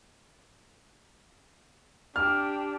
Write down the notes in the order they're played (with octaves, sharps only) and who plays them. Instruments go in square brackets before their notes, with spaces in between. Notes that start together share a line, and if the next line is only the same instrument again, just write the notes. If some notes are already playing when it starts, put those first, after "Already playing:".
[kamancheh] D4 G4 [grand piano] F6